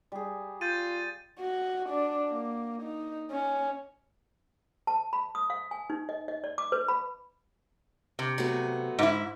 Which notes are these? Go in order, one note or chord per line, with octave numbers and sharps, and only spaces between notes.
G3 G#4
F4 G6 A6 D#7
F#4
D4
A#3
D#4
C#4
A5
B5
D#6
F5
G#5
D#4
D#5
D#5
D5
D6
B4
B5
C3
F#3 A3 B3
G#2 E4